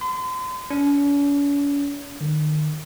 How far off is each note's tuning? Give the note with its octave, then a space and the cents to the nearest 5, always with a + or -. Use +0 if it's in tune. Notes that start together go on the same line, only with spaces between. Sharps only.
C6 -40
C#4 +45
D#3 -35